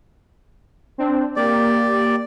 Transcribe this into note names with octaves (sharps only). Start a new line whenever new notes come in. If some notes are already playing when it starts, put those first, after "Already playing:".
C4 D4
A#3 G4 D5